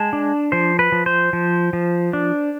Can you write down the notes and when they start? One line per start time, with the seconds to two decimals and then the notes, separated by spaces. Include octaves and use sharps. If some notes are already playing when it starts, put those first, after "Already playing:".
Already playing: G#3 A5
0.13 D4
0.52 F3 C5
0.79 B4
0.92 F3
1.06 C5
1.33 F3
1.73 F3
2.13 D4